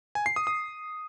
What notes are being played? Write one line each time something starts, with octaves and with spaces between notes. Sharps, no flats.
G#5
C7
D#6
D#6